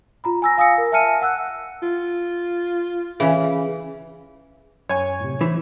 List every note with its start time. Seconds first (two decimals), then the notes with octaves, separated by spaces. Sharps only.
0.24 F4 A#5 B5
0.42 G#5 E6 A#6
0.58 F5 G#5 D#6 E6 A#6 C#7
0.78 A#4
0.92 E5 G#5 A5 F6 C#7 D#7
1.22 F#5 E6 F#6
1.82 F4
3.20 C#3 E3
4.89 F#2 C#5 G#5
5.20 A2 C3
5.41 E3 C5